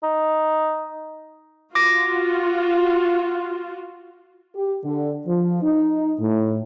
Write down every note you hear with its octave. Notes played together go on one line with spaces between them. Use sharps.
D#4
F4 F#4 D6 A#6
G4
D3
F3
D#4
A2